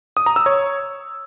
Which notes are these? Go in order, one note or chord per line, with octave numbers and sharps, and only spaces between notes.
D#6
A#5
E6
C#5